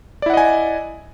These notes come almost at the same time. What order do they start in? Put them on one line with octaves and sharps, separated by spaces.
D5 E4 F#5 D#5 G#5